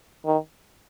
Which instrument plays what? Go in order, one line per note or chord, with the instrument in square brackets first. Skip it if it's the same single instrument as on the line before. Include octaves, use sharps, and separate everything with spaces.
[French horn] D#3